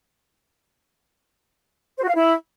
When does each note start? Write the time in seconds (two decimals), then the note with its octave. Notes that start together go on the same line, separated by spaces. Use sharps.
1.97 C5
2.03 F#4
2.09 F5
2.15 E4